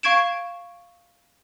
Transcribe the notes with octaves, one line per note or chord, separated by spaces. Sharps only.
F5 C#6 G#6 D7 E7